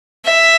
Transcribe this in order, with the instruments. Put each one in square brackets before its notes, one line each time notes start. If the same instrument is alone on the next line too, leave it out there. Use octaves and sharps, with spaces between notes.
[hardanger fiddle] E5